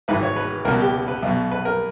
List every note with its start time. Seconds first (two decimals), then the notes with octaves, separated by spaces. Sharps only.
0.08 G#1 G#2 E3 B4
0.23 C#5
0.36 B4
0.65 C#2 A#4
0.68 B2
0.80 G4
1.08 B4
1.22 B1 B2
1.52 B4
1.65 A#4